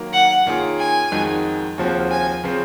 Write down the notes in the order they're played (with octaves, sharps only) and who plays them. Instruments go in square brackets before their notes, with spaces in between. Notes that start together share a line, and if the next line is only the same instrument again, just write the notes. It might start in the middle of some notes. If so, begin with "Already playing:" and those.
Already playing: [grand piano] D#3 F#3 A#3
[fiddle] F#5
[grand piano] D#3 A#3 C#4 F4 G#4
[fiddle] G#5
[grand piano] F2 D#3 G#3 D#4 F#4
D#2 C#3 F3 C4 F#4
[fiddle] G#5
[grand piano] C#3 F3 C4